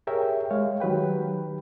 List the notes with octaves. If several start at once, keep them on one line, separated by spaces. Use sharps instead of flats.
G4 G#4 A#4 C#5 E5 G5
G#3 C#5 F5
D#3 F#3 G4 B4 G5